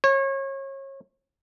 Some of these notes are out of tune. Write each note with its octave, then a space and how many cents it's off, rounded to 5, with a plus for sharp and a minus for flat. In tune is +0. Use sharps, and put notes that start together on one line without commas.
C#5 -30